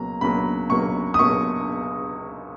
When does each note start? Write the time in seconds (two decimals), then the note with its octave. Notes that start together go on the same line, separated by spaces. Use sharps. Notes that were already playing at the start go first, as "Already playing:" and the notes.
Already playing: C#2 B2 F#3 A#3 A#5
0.21 C#2 B2 F#3 A#3 B5
0.70 C#2 B2 F#3 A#3 C#6
1.14 D#6
1.19 C#2 B2 F#3 A#3 C#6